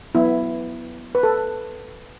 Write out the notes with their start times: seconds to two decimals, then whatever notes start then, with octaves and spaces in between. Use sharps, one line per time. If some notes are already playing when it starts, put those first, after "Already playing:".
0.15 F#3 B3 E4
1.15 B4
1.23 A4